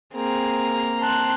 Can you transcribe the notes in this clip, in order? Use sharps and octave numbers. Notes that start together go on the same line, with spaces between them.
A#3 C4 G#4 A#5
C4 A5 C6 F#6